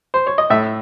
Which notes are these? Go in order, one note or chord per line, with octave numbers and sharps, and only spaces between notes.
C5
C#5
D#5
A2 E5